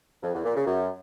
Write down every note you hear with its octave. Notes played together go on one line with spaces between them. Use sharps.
F2
E2
A#2
C#3
F#2